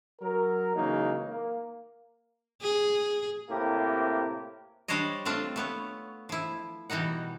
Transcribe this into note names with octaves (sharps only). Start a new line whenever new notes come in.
F#3 A#4
C#3 E3 F#3 G#3 A#3 D#4
A#3
G#4
A2 C3 A#3 G4
G3 D4 C5 C#5 D#5
A3 C4 D4 F4
A3 B3 C#5
F3 E4
B2 E3 G3 D#4 F#5